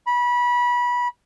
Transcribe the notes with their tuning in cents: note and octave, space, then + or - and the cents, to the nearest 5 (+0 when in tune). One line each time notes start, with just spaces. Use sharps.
B5 -25